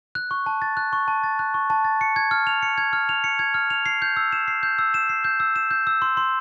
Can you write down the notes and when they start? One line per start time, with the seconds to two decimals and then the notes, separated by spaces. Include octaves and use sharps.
0.15 F#6
0.31 C#6
0.46 A5
0.62 A6
0.77 F#6
0.93 C#6
1.08 A5
1.24 A6
1.39 F#6
1.54 C#6
1.70 A5
1.85 A6
2.01 C#7
2.16 G#6
2.31 F6
2.47 F7
2.63 C#7
2.78 G#6
2.93 F6
3.09 F7
3.24 C#7
3.39 G#6
3.54 F6
3.70 F7
3.86 C7
4.02 G6
4.17 E6
4.32 E7
4.48 C7
4.63 G6
4.79 E6
4.94 E7
5.09 C7
5.24 G6
5.40 E6
5.56 E7
5.71 G6
5.87 E6
6.02 C6
6.17 C6